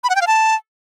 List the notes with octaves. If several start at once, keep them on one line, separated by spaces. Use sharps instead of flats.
B5
F#5
G5
F5
A5